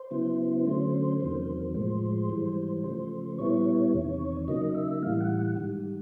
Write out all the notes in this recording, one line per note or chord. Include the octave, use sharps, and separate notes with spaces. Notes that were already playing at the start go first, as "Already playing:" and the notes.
Already playing: C5
C#3 F#3 B3 E4
D3 F#3 A3 C#4
E2 C3 D#3 F#3 A#3
A2 F3 G#3 C5
G#2 E3 G3
C#3 F3 A3 C5
A#2 G3 B3 E4 C#5
E2 C3 D#3
C#3 F#3 A#3 D#4 D#5
E5
A2 E3 G3 F5
F#5
F#5
G#2 D#3 G3